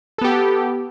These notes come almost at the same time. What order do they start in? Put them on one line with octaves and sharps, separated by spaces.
A4 B3 G4